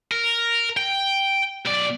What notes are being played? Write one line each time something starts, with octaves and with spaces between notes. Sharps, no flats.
A#4
G5
B1 D5